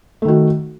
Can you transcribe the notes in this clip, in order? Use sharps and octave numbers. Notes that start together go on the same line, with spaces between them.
D#3 A3 F#4